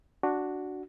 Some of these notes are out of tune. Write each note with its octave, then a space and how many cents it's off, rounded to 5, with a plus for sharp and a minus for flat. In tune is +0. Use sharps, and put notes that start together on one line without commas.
D4 +0 F#4 +0